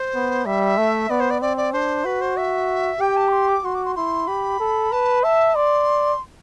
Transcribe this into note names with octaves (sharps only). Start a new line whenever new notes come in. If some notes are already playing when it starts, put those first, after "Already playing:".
Already playing: C5
B3
G3 E5
A3
B3 D5
C5
D5
C4 D5
D5
D4 C5
F#4 B4
C5
E5
G4 G5
A5
D6
C6
D6
F#4 C6
D6
C6
E4 C6
G4 B5
A4
B4 A5
E5 A5
D5 C6